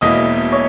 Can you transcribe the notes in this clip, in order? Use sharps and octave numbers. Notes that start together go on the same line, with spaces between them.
E1 E2 B2 A#3 E4 D#5 D#6
C#5 C#6